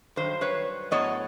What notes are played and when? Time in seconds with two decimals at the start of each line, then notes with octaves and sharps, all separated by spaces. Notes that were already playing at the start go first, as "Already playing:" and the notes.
0.16 G2 D#3 F#3 C5
0.41 B4 C#5
0.91 A2 F#3 B3 C#5 D#5